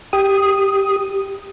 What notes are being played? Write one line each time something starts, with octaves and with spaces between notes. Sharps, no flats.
G4 D#6